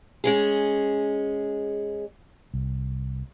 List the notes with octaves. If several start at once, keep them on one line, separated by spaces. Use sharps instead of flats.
G#3 C#4 G#4
C2